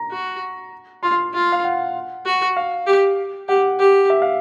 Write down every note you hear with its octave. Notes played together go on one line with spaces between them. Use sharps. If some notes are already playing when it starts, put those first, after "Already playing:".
Already playing: A#5
F#4
F4 C6
F4
F5
F#5
F#4
F5
G4
G4 F#5
G4
E5
F5